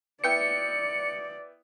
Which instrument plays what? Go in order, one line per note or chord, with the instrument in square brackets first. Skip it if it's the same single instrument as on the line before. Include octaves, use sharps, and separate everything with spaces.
[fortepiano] B3 E4 G5 [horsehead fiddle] D5 [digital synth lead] C#7